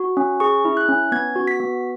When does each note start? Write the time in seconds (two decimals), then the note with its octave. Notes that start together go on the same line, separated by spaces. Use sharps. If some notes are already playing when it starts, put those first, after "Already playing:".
Already playing: F#4
0.17 C#4
0.40 G#4 C#6
0.65 E4
0.77 F#6
0.89 C#4
1.12 B3 G#6
1.36 F#4
1.48 B6
1.60 B3